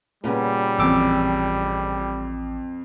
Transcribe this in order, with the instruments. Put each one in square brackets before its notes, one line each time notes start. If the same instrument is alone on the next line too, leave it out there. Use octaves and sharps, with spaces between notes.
[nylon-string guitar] A#2 C#3 B3 [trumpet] G3
[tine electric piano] A1 D6 [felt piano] F2 E6